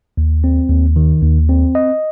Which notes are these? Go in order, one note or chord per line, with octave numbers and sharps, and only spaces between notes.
D#2
C4
D#2
D#3
D#2
C4
D#5